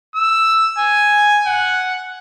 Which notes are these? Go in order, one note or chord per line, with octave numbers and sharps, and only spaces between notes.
E6
G#5
F#5